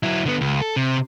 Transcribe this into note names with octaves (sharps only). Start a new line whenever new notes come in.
F#3 E4
D3 B3
C#2
A4
C3